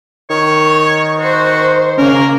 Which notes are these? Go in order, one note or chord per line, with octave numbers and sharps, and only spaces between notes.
D#3 C#5
F#4 C5
C#3 A#3 C#4 A#4